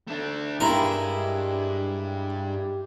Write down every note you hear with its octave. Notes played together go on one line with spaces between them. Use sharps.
A3 D4
G2 G#3 E4 G4 A#4